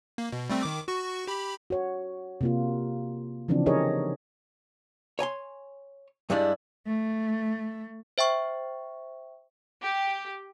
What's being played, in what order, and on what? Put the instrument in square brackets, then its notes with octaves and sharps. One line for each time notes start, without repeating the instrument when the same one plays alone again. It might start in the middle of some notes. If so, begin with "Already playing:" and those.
[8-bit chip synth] A#3
B2
G3 A3 C4
D#3 D6
F#4 C#6
G4 B5
[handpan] F#4 C#5
C3 A#3 F4
C#3 E3 F3 C4 D4
D#4 G4 G#4 A#4 C#5 D#5
[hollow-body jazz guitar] C#5 G#5 A#5 C6
G2 G3 G#3 D4 E4
[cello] A3
[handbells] C5 E5 G5 C#6
[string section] G4